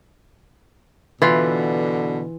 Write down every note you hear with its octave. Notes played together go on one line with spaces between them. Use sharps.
B2 D3 E3 F4